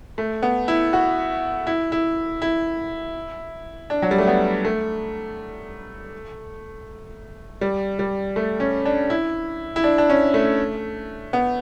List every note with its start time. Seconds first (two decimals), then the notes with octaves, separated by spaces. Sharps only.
0.18 A3
0.43 B3
0.68 E4
0.93 F#4
1.67 E4
1.92 E4
2.42 E4
3.90 D4
4.02 F#3
4.11 G3
4.18 A3
4.27 B3
4.65 A3
7.61 G3
7.99 G3
8.36 A3
8.60 C#4
8.85 D4
9.10 E4
9.76 E4
9.84 D4
9.98 D4
10.09 C#4
10.34 A3
11.33 B3